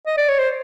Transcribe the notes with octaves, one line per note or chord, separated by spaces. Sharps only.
D#5
D5
C#5
C5